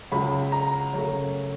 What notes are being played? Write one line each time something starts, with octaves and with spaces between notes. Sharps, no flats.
C#2 C#3 F#3 B5
A#5
F#2 C#3 F#3 A3